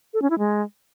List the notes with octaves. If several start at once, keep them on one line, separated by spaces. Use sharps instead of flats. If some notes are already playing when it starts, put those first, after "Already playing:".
A4
C#4
E4
G#3